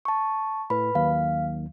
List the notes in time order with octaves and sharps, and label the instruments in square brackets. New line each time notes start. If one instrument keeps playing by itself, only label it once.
[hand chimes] A5 C#6
[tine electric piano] A2 [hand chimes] B4 B5
[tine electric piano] D#2 D#3 F#3 [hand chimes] F5